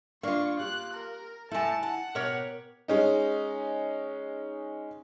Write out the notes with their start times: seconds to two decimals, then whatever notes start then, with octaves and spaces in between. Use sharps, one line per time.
0.23 A#3 D4 F4 F5 C#6
0.60 G4 F#6
0.93 A#4
1.51 A2 A3 E4 G#5 A5
1.83 F#5 A5
2.15 B2 G4 A#4 C#5
2.88 G#3 C#4 D#4